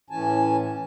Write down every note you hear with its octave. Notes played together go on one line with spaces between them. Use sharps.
A2 E3 C#4 G#5 A5